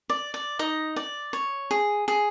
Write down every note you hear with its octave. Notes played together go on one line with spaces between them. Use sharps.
D5
D5
D#4 D#5
D5
C#5
G#4
G#4